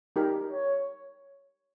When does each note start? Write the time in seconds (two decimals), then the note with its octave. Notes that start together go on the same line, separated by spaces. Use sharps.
0.16 D#4 G4 A#4
0.51 C#5